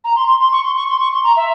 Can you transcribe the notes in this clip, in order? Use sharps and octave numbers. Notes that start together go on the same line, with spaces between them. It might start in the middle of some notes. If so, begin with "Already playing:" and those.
A#5
C6
C6
C6
C#6
C6
C#6
C6
C#6
C6
A#5
E5